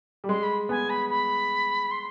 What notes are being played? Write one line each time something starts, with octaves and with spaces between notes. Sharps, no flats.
G3
G#3 C6
B5
B3 G#5
B5
B5
C6